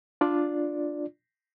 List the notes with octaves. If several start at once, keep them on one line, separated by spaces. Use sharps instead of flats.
D4 F4 D5